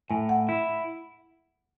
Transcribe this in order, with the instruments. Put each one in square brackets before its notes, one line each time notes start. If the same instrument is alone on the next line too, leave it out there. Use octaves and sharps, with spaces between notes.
[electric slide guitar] A2 [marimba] G#5
[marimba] F#5
[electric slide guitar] E4